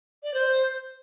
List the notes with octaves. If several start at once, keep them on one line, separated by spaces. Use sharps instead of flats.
D5
C5